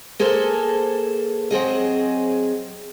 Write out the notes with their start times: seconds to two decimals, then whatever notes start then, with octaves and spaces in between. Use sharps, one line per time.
0.19 A#3 G#4 A4 C5
1.51 F#3 C4 G#4 D#5